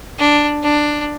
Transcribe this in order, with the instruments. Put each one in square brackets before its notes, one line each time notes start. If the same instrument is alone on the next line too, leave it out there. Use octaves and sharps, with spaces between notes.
[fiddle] D4
D4